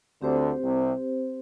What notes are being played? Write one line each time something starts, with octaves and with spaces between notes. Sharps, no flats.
D2 D3 C4 G4 C5
C2 C3